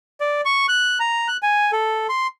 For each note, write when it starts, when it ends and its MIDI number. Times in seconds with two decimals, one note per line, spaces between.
0.20 0.41 74
0.45 0.66 85
0.68 0.98 90
1.00 1.28 82
1.28 1.37 90
1.43 1.71 80
1.72 2.07 69
2.09 2.27 84